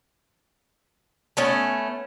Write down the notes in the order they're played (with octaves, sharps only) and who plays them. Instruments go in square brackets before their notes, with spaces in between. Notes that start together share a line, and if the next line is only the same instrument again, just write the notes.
[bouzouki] A3 B3 C#4